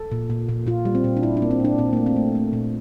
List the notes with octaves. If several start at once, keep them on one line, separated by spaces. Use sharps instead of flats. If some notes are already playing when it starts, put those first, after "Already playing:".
Already playing: A4
A#2
A#2
A#2
A#2 F4
G3
C4
A#2
D4
A#2 E4
D4
A#3
C4
A#2 D4
A#2 C4
A3 A#3
C4
A3
A3
A#2